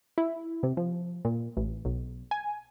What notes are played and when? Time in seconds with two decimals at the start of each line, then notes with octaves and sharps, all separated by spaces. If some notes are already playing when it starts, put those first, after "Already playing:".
0.18 E4
0.63 C3
0.77 F3
1.25 A#2
1.57 A1
1.85 B1
2.31 G#5